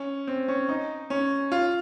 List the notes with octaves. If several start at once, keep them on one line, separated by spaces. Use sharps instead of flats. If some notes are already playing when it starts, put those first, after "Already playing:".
Already playing: C#4
C4
C#4
D#4
C#4
F4